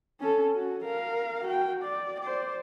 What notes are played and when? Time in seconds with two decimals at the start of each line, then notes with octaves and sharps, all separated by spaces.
0.20 C#4 A4
0.55 F#4
0.85 A#4 F5
1.44 F#4 G5
1.83 D5
2.21 C5 D5